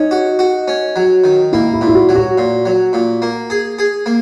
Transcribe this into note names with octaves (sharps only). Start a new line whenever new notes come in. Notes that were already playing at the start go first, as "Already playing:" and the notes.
Already playing: C#4 D#4
F#4
F#4
C#4
F#3
D#3
A#3 E4
E4
A#2
E4
F#4
F#3
F#4
A#2
F#3
A#2
A#3
G#4
G#4
A#3